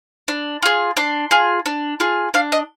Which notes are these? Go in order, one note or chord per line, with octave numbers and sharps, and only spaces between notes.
D4
F4 G#4
D4 C6
F4 G#4
D4
F4 G#4
D4 F5
D#5